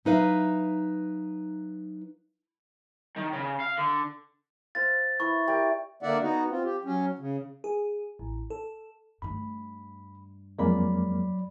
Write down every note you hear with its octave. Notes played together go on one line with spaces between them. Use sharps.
F#3 D#4 B4 E5 F5
D#3
C#3
F5
D3
C5 F5 A6
E4 B4 E5 C#6
G4 A#4 D5
D3 A#3 D5 E5 F#5
B3 D#4 F#4
C4 F4
G4
F#3 C#4
C#3
G#4
A1
A4
G2 A3 B5
F2 F#3 G#3 A#3 D5 B5